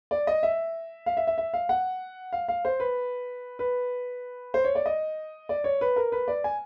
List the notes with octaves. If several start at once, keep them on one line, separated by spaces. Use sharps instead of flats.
D5
D#5
E5
F5
E5
E5
E5
F5
F#5
F5
F5
C5
B4
B4
C5
C#5
D5
D#5
D5
C#5
B4
A#4
B4
D5
G#5